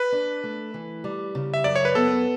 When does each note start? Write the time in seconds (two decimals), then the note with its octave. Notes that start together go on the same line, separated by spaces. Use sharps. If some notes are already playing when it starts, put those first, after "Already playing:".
Already playing: B4
0.12 D4
0.44 A3
0.74 E3
1.04 G3
1.35 C#3
1.54 E5
1.64 F#2 D5
1.76 C#5
1.85 B4
1.95 B3 A4